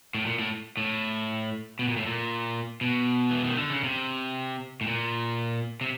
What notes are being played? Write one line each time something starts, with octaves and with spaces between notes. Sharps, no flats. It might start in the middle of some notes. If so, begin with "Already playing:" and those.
A2
A#2
A2
A2
B2
A#2
A2
A#2
B2
E3
D#3
D3
C#3
C3
A2
A#2
C3